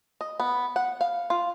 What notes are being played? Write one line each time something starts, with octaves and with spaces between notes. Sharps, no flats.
D#5
B3
F#5
F5
F4